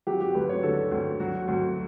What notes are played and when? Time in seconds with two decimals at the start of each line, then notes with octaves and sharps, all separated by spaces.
0.07 F#3 G4
0.20 G4
0.35 D2 B4
0.49 C#5
0.63 D3 A4
0.91 D2
1.20 F#3 F#4
1.48 D2